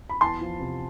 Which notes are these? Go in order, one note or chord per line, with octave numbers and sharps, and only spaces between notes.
B5
E2 A5 C6
F3
C3